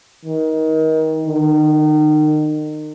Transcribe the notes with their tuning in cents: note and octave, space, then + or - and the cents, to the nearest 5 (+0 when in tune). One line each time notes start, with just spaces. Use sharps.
D#3 +25
D#3 -30